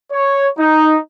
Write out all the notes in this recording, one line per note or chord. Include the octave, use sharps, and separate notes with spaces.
C#5
D#4